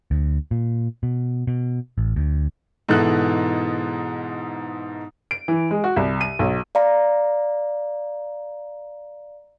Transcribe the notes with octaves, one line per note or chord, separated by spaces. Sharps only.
D2
A#2
B2
B2
A1
D2
G#2 B2 E3 A4 F#6
D7
E3
G#3
F#4
C2
D#7
B1
D5 F5 A#5